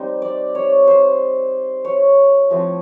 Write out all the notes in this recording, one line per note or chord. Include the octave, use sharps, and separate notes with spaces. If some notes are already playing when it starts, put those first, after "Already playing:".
Already playing: G3 C4 D#4
D5
C#5
C5
C#5
F3 A3 C4 E4